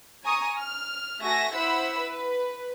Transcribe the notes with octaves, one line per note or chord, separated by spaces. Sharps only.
G#5 A#5 C#6 D#6
F6
A3 F#4 E5 G#5 A#6
E4 C5 E5 F#5 B5 E6
B4